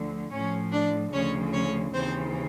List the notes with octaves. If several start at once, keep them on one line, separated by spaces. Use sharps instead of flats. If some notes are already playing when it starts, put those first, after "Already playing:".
Already playing: D2 D3 F3
A2 F3 C#4 C#5
D4 D5
D2 C#3 F3 C#4 C#5
C#4 C#5
D#2 C#3 E3 C4 C5